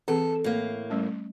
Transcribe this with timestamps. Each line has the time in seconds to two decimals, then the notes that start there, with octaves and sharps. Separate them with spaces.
0.08 E3 C4 G#4 A4
0.44 A2 A#3
0.90 G3 A3 C#4